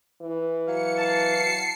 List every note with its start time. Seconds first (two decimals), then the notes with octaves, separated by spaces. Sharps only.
0.21 E3
0.68 F#3 F5 C#7
0.97 A5 C7 C#7